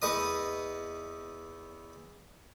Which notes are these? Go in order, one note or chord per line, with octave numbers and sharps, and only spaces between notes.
E2 B4 D#5 D#6